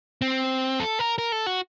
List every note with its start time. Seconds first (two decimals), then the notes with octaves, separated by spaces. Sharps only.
0.22 C4
0.80 A4
0.99 A#4
1.18 A#4
1.32 A4
1.46 F#4